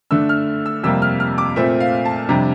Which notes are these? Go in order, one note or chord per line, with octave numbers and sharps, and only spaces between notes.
D3 A3 D4 E6
F6
E6
F2 C3 G3 A#3 E6
F6
F6
D6
A#2 A3 C4 E5
F5
A5
F2 C3 G3 D4 A#5